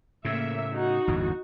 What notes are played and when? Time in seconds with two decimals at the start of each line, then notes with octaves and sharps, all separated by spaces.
0.25 A2 C#3 A#3 E5
0.73 D#4 F#4
1.07 G1 E2 A2